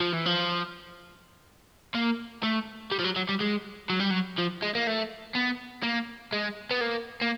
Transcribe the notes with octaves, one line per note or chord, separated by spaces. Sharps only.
F3
E3
F3
A#3
A3
G3
F3
F#3
F#3
G3
G#3
F#3
G3
F#3
F3
G#3
A#3
A3
B3
A#3
G#3
B3
A#3
A#3